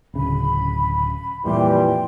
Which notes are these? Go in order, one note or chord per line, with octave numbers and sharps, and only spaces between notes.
D1 C#3 B5
F2 A#2 E3 G3 G5 C6